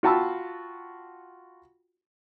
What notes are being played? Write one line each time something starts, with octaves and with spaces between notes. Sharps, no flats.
F4 F#4 G5 A5 B5 E6